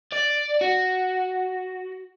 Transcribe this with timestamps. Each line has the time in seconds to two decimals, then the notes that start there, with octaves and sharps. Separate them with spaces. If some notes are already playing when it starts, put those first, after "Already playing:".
0.13 D5
0.61 F#4